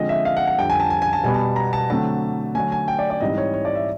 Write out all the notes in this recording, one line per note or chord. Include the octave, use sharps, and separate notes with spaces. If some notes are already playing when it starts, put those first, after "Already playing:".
Already playing: D3 F3 G#3 C4 D#5
E5
F5
F#5
F#5
F2 D3 G3 G5
G#5
A5
G#5
G#5
A5
B2 G3 B3 G#5
A5
A#5
A5
D3 F#3 A3 C4 A5
D3 F#3 A3 G#5
G#5
G5
D5
D5
G#2 E3 G3 C4 D#5
C#5
C#5
D5
E5